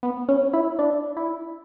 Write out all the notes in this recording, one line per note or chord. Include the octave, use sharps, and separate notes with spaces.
B3
C#4
E4
D4
E4